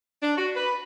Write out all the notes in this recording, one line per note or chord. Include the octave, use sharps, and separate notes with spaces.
D4
F#4
B4